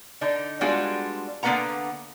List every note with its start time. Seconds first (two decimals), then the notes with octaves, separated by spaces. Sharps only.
0.21 D3 D4 D#4
0.61 G3 G#3 B3 D4 F4 F#4
1.43 D3 A#3 B3 B4 F#5 A#5